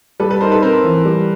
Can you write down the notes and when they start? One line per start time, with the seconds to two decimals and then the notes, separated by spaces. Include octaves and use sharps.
0.20 G3 A4 B4
0.31 A4 B4
0.41 D#4 A#4 C5
0.52 A4 B4
0.63 C4 A#4 C5
0.84 E3
1.05 G3